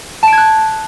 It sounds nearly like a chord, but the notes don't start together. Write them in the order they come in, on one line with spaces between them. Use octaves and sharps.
A5 D7 G#6 F#6